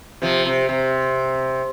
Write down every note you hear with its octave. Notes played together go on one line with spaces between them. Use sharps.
C3 F3
C3
C3